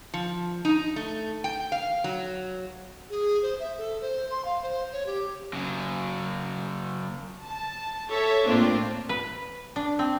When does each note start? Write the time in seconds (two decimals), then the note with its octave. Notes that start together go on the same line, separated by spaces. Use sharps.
0.14 F3
0.65 D#4
0.96 A3
1.44 G5
1.72 F5
2.04 F#3
3.10 G#4
3.42 C5
3.60 E5
3.78 A4
4.01 C5
4.31 C6
4.45 F5
4.62 C5
4.92 C#5
5.06 G4
5.53 C#3 F#3
7.43 A5
8.08 A4 C#5 E5
8.45 A2 A#3 C4 D4 F4
9.09 B4
9.76 D4
9.99 C4